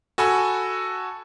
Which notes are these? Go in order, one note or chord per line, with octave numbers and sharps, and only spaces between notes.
F#4 A4 G#5 B5 E6